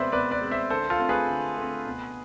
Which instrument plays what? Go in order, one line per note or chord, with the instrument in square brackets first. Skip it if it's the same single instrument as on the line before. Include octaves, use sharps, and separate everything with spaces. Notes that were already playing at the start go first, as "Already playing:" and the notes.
Already playing: [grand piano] B2 G#3 C4 B4 C5 D5 E5
B2 B4 D5
B4 D5
G#3 C4
C5 E5
D3 A4 C5
F4 A4
A3 C4
G#4 B4
D3
A3 C4
B2